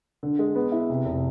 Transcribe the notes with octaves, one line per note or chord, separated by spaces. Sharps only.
D3
G#3
B3
E4
C3
F1